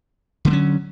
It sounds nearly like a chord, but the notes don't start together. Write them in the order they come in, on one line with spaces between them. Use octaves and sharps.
D3 A3 F#3 C#4